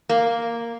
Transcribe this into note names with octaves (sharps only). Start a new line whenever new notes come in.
A#3